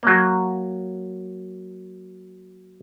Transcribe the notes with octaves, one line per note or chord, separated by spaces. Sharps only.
F#3 A#3